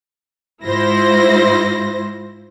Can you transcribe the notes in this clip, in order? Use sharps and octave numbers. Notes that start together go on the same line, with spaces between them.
G#2 E4 F4 C5 A#6